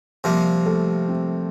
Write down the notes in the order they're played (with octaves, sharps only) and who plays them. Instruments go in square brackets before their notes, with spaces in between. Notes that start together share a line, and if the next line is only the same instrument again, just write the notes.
[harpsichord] C3 F3 A#3 [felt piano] G3 G4
[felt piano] A3 A4
C4